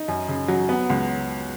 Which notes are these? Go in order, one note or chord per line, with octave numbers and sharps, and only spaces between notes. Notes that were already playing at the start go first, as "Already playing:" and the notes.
Already playing: D#4
F#2
C#3
F#3
B3
C#2